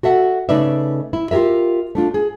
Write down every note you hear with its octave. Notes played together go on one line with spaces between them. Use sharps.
F#4 A4 E5 F#5
C#3 A3 D#4 B4 D5 E5
E4
F4 G4 G#4 A#4 E5
A3 D4 F4
G#4